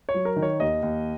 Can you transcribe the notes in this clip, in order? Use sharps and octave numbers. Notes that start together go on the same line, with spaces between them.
C#5
F#3
A#4
D#3
C#5
D#2 D#5
D#2